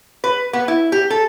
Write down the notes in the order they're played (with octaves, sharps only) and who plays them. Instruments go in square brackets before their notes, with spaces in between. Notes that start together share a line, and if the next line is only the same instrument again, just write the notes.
[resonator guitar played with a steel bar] B4
B3
E4
G4
A4